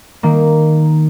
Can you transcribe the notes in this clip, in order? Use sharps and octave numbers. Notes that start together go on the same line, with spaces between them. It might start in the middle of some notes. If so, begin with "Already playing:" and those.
D#3 A#3